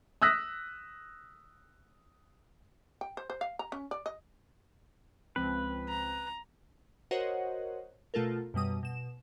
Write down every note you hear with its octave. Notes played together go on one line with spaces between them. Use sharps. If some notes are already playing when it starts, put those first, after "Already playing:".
D#6 E6 F#6 A#6 B6
G5
C5
C5
F5
A#5
C#4
D5
D#5
C#2 F3 C4 B4
A#5
F#4 A#4 C5 C#5 D#5 F#5
B2 A3 F4 A4 A#4
F#2 B2 G3 D#6
B2 E7